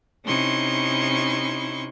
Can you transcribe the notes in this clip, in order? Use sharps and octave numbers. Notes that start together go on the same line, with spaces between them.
C3 C#4 D#4 E4 C6 C#6